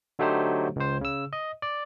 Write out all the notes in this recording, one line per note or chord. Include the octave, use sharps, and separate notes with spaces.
D3 F#3 A3 D#4 G4 C5
C#2 C5
C#3 E6
D#5
D5